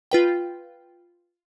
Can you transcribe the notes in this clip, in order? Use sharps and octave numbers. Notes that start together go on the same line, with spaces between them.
F4 B4 G5